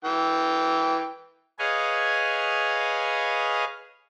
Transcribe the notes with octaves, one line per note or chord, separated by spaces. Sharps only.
E3 G5
G#4 B4 C#5 D#5 F5 G#5